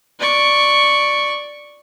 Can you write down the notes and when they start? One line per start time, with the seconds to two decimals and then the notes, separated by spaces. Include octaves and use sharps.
0.20 D5 C#6